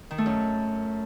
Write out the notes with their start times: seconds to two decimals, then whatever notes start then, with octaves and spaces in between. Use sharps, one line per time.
0.11 D#3
0.18 A3
0.26 F#2